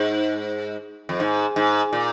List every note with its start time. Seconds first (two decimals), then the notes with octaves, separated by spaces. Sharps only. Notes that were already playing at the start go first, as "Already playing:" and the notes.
Already playing: G#2
1.09 F2
1.20 G#2
1.56 G#2
1.93 A#2